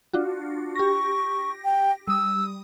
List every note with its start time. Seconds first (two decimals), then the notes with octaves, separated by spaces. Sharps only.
0.13 D4 F4 F#4
0.76 G4 C#6 A#6
1.65 G5
2.08 G3 D#6 E6